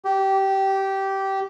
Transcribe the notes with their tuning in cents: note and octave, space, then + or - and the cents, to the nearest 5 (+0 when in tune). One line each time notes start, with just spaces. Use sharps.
G4 -15